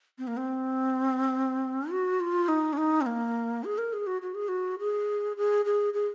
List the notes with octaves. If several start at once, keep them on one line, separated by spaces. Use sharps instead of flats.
C4
A#3
C4
F#4
F4
D#4
C#4
D#4
C4
A#3
G#4
A#4
G#4
F#4
F#4
G#4
F#4
G#4
G#4
G#4
G#4